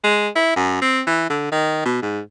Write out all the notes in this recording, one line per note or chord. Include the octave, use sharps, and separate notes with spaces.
G#3
E4
F#2
C4
E3
D3
D#3
B2
G#2